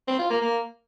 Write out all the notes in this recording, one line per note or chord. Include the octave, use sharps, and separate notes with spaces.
C4
F4
A#3
A#3